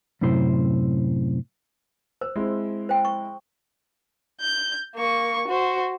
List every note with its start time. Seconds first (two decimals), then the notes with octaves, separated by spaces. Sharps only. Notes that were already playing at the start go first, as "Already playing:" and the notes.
0.21 F#2 A2 C3 E4 C5 C6
2.21 C5 E6
2.36 G#3 C4 E4
2.89 C5 G5
3.05 C#6
4.41 G6
4.96 A#3 C#6
5.48 F#4 C5